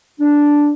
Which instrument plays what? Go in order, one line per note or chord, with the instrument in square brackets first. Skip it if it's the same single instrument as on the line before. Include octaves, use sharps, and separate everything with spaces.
[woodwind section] D4